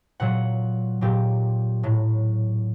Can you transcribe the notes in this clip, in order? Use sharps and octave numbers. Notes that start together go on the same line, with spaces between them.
A#2 F#3 F#5
A#2 F#3 G4
A2 F#3